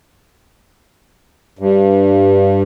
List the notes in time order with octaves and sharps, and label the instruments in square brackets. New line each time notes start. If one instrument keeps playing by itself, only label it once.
[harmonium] G2